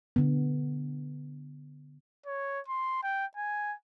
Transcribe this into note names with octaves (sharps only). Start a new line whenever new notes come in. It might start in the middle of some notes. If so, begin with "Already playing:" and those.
D3 B3
C#5
C6
G5
G#5